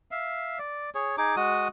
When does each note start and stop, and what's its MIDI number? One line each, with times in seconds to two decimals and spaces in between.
0.11 0.59 76
0.11 0.59 77
0.59 0.90 74
0.95 1.16 68
0.95 1.16 73
1.18 1.36 63
1.18 1.36 68
1.18 1.36 86
1.36 1.68 56
1.36 1.68 66
1.36 1.68 87